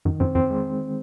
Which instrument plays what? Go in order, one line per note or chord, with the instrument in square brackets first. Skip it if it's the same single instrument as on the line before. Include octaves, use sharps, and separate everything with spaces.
[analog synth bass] F#2 [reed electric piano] D#3
[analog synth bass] F#2 [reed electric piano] C4
[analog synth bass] F2 [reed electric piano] C4
[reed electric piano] G#3